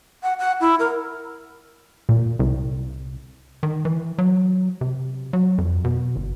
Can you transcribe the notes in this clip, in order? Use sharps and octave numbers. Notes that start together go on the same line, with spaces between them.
F#5
F#5
E4
A#4
A#2
C2
D#3
E3
F#3
C3
F#3
F2
B2
G1